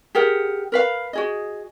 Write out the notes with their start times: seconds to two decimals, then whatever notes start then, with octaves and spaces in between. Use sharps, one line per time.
0.15 G4 G#4 A#4 F#5
0.72 A#4 B4 F5
1.13 F#4 G#4 D#5